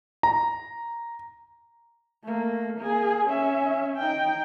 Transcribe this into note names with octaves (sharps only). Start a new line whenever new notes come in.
A#5
A3 A#3
A#3 G#4
C#4 E5
D#4 G5